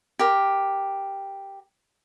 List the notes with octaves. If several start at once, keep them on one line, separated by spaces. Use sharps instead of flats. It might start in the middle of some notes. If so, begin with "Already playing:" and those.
G4 A#4